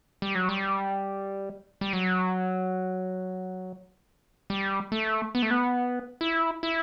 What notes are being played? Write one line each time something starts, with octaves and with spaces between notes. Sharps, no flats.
G3
F#3
G3
G3
F#3
G3
A3
B3
A3
B3
E4
E4